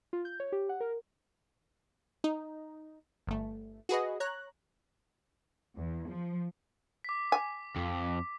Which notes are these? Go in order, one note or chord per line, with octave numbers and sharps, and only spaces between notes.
F4
G6
C#5
G4
F#5
A#4
D#4
G1 A3
F#4 G#4 B4 D#5
C#5 A#5 F#6
E2
F3
D6 B6
G#5
F2